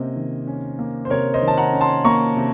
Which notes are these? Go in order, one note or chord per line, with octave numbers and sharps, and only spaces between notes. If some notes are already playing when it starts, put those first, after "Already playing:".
Already playing: C3 A#3 C#4 C5 D#5
D#3
C#4
A#3
C5
C3 A#4 C#5
C5 D#5
D#3
A5
F#5 A#5
C#4
A5 C6
A#3 A#5 C#6
C3